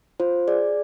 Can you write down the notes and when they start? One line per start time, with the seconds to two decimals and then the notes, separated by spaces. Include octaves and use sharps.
0.20 F4 C5
0.48 G#4 D5